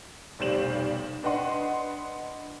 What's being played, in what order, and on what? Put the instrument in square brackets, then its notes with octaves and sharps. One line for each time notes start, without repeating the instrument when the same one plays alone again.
[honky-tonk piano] F1 B1 G3 C5 E7 F#7
D4 B4 D#5 F#5 C6